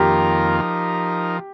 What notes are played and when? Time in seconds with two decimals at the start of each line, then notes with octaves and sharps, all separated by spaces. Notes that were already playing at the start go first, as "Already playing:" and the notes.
Already playing: F2 D#3 A#3 F4 G4 A#4
0.61 F3 D#4 A#4